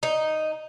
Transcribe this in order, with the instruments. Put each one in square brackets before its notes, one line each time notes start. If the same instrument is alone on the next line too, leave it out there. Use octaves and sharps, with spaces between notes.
[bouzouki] D#4